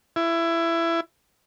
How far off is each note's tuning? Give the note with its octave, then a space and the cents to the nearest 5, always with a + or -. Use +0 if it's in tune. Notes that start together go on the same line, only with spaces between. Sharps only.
E4 +20